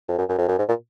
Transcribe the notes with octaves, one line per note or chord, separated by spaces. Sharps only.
F2
F#2
F#2
F2
F#2
G#2
A#2